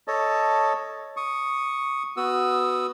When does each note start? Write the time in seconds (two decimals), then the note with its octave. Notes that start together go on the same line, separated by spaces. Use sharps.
0.08 A4 C#5 D#5 A5
1.17 C#6 D#6
2.17 B3 F#4 D#6 E6